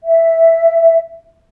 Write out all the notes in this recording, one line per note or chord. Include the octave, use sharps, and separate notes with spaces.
E5